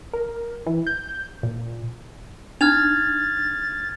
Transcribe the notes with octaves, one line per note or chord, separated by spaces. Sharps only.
A#4
E3
G6
A#2
D4 D#4 F6 G#6 A6 F7